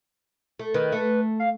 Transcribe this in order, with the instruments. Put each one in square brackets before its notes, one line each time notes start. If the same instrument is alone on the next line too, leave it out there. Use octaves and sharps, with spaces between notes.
[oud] A3
[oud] D#3 [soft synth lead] B4
[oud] A3
[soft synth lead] F5